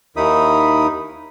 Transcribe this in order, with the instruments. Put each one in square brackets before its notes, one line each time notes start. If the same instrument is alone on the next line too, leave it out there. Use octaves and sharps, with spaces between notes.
[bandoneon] D#2 D#3 D#4 E4 B5 D#6